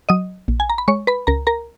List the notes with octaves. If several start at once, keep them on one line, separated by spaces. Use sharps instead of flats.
F#3 D#5 D#6
A#1
G#5
A#5
B5
G#3 C#5 C#6
B4 B5
C#2 A#4 A#5
A#4 A#5